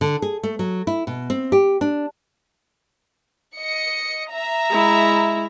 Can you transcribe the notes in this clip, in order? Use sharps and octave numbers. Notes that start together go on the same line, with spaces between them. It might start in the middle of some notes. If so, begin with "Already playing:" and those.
D3
G#4
A3
F#3
E4
B2
C4
G4
D4
D#5 C#7
E5 A#5
G#3 E4